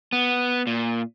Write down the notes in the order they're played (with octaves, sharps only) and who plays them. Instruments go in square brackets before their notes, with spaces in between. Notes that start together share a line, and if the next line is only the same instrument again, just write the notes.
[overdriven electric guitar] B3
A#2